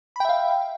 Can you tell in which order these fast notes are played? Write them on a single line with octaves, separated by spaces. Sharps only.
B5 G5 E5 F5